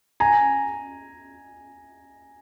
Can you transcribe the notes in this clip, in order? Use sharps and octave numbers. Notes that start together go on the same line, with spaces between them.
G#5 A#5